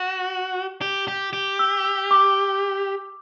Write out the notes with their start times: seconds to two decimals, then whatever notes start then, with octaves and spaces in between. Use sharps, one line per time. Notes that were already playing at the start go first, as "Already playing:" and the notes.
Already playing: F#4
0.81 G4
1.08 G4
1.33 G4
1.59 E6
1.85 E6
2.11 D6